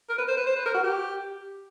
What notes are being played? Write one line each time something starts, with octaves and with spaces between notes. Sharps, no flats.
A#4
B4
C5
B4
C5
B4
A#4
F#4
G4